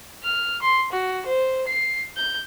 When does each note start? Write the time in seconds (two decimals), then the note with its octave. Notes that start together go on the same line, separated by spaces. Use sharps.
0.23 F6
0.62 C6
0.91 F#4
1.26 C5
1.67 C7
2.17 G6